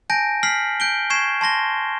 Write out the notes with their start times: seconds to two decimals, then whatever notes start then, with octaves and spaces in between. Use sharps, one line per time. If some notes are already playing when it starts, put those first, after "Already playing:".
0.10 G#5 A5 G6 A#6 D7
0.43 F6 B6 C7 F#7
0.80 G6 D7 G7
1.10 C#6 G#6 C7 E7
1.41 A5 C6 A#6 G7